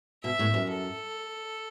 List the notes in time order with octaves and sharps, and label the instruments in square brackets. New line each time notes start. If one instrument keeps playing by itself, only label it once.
[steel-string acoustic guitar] B2 [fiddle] E5
[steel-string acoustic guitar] A2
F#2
[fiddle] A4